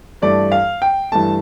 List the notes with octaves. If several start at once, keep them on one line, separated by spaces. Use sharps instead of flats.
G2 E3 A3 D5
F5
G5
G2 E3 A3 A5